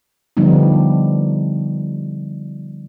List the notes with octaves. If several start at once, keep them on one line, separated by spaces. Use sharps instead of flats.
D3 F3 G3 B3 D#4